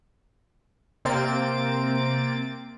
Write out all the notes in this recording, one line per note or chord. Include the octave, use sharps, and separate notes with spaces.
C3 A#3 C4 A6 D7